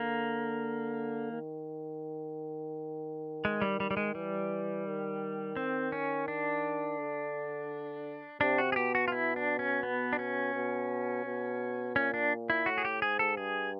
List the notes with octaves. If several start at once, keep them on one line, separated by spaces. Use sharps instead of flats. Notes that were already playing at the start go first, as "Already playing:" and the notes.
Already playing: D3 A#3
D#3
G#3
G3
G3
G3
G#3
E3 G3
D#3
C4
C#4
D4
D3
C3 D4
F#4
G#4
B2 G4
F#4
F4
E4
D4
C#4
B3
D4
C#4
B2
B2
A#2 C#4
D4
E4
A2 F#4
G#4
G4
G#2 G#4
A4
G2 G#4